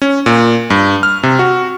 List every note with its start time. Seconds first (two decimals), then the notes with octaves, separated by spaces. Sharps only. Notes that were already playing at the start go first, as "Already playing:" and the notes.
0.02 C#4
0.26 A#2
0.70 G2
1.03 F6
1.23 C3
1.39 F#4